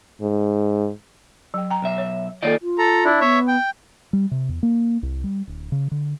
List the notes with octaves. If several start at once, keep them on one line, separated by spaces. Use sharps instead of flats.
G#2
F#3 G5
G5 A#5
B1 E5
C#5
D#3 A#3 F4 A4 D5 D#5
F4
A4 A#5
D4 E4
B3 C#5 E5
G5
G3
C3
E2
A#3
C2
G3
D1
C#3
D3